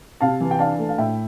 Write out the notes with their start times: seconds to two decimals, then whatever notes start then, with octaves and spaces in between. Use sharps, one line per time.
0.21 C3 F5 A5
0.41 E3
0.51 G5
0.59 D4 F5 A5
0.79 A3
0.89 F5
0.98 A2 E5 G5